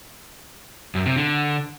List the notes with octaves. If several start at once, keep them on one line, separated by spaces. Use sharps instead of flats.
F#2
C3
D3